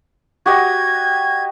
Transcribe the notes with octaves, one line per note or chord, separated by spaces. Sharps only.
F#4 G4 D#5 G#6